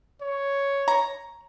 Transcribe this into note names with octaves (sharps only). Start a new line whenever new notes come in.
C#5
A#5